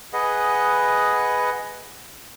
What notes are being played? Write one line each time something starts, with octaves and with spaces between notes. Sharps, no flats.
G#4 B4 D#5 F#5